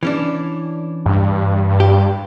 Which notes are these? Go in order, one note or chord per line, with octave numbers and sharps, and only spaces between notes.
E3 C#4 D4
G2
G4